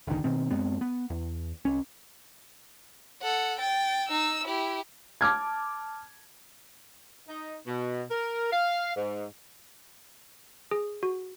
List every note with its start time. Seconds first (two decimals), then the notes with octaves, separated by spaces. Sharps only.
0.07 F1 B1 D3 D#3
0.24 B2 D#3 C4
0.50 F#2 G#3 B3 C4
0.81 B3
1.10 E2
1.65 C2 C#4
3.23 A4 F#5
3.60 G5 A6
4.09 D#4 E6
4.46 E4 G4
5.21 A5 D6 F6 G#6
7.28 D#4
7.67 B2
8.11 A#4
8.52 F5
8.96 G#2
10.71 G#4
11.03 F#4